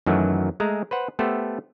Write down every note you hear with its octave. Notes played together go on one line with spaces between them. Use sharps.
F#2 D#3 E3 F#3 A3
G#3 A3 G#4 A#5
B4 C5 F#5
A3 B3 G4 A4 C5